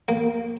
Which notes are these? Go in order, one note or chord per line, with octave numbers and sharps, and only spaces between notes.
A#3